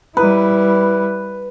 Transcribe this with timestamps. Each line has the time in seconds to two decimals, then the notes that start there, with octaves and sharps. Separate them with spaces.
0.17 G3 E4 B4